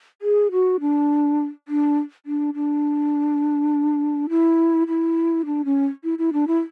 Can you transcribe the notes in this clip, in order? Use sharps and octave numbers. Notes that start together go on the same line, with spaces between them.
G#4
F#4
D4
D4
D4
D4
E4
E4
D4
C#4
E4
E4
D4
E4